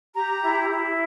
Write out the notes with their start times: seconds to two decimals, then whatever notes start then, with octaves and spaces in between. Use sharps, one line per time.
0.15 G4 A#5
0.42 E4
0.69 E4